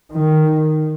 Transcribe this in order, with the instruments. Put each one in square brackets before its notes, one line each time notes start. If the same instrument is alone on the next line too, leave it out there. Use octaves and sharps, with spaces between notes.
[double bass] D#3